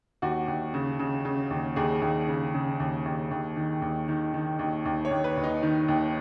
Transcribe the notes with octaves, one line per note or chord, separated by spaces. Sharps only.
D#2 F#4
D#2
C#3
C#3
C#3
D#2
D#2 G#4
D#2
C#3
C#3
D#2
D#2
D#2
D#3
D#2
D#3
D#3
D#2
D#2
C#5
D#2
B4
D#2
D#4
D#3
D#2